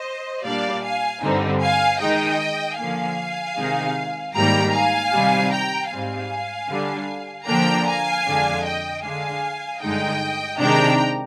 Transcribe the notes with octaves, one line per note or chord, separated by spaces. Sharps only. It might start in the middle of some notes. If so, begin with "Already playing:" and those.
Already playing: C5 D#5
A#2 G3 A#3 D4 D5 F5
F5 G#5
G2 D3 G3 C4 D#4
F5 G#5
D#3 G#3 D#4 D#5 G5
D3 F3 A#3 F5 G#5
C3 D#3 G#3 D#4
G#2 D#3 G3 A#3 G5 A#5
F5 G#5
C3 D#3 G3
G5 A#5
G#2 G3 C4 F5 G#5
D3 G3 D4
D3 F3 A#3 D4 G5 A#5
F5 G#5
F2 D3 G#3 D4
D#5 G5
D3 G#3 D4 F5 G#5
G2 D3 G#3 D#4 D#5 G5
C3 D#3 G#3 D4 G5 A#5